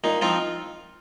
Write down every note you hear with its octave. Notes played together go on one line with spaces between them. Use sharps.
A#2 D#4
F3 C4 D#4 F4